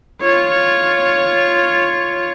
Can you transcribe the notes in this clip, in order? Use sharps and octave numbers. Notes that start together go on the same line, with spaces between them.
F4 C#5